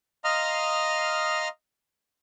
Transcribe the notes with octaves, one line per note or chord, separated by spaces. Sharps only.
D#5 F5 A#5 C6 D#6 F6